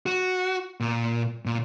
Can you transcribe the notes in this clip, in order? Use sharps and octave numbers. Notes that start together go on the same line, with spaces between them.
F#4
A#2
A#2